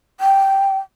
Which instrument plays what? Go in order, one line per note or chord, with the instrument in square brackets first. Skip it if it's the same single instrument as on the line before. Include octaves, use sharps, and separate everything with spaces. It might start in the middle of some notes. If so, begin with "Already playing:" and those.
[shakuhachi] G5